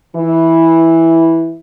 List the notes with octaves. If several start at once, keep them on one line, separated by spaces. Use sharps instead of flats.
E3 E4